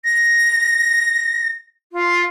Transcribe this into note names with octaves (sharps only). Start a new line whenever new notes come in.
A#6
F4